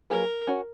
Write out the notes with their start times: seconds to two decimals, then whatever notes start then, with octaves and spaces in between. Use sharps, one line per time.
0.10 F#3 A#3 F4 G#4 A#4 B4
0.47 C#4 F#4 C#5